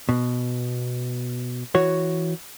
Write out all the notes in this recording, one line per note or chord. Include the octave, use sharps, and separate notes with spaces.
B2
E3 F#4 C#5